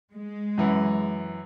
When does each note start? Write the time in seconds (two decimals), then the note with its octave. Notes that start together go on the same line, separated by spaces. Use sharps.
0.11 G#3
0.58 F#2 E3